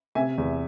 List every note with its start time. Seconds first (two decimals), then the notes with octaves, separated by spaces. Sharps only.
0.15 C3 E5 G#5
0.38 E2